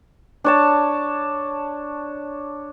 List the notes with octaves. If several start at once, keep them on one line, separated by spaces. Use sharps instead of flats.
D4 C#5 A5